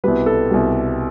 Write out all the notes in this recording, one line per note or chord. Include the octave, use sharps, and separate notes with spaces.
C2 B2 G3 B4
A4
C2 B2 G3